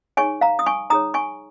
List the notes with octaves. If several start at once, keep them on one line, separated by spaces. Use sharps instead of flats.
D#4 G#4 C#5 G#5 C#6
F5 A#5
D#6
G#5 C#6
D#4 G#4 C#5 A#5 D#6
G#5 C#6